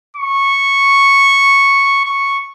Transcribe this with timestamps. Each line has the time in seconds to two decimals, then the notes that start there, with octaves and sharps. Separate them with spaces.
0.17 C#6
2.05 C#6